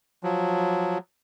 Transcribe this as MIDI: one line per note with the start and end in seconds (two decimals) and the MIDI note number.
0.23 0.98 53
0.23 0.98 54